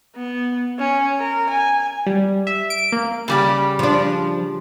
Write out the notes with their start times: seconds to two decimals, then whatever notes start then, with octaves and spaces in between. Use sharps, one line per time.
0.16 B3
0.79 C#4
1.18 A#4
1.50 G#5
2.06 G3
2.47 E5
2.70 D7
2.92 A#3
3.28 C#3 G3 G4
3.79 F3 D4